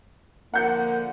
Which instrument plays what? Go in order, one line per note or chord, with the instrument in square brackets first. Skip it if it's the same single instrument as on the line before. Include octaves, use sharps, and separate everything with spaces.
[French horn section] D3 F3 A#3 [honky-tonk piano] F#5 G6 C#7